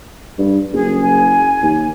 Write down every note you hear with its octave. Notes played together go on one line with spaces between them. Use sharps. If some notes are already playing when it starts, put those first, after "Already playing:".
G2
F#1 G#4
G#5
D#2